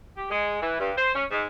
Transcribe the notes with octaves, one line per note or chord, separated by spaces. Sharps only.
G4
G#3
E3
G2
C5
C#4
G#2